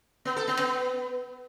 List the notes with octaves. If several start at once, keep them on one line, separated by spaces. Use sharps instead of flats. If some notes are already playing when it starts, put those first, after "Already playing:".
B3
A4
B3
B3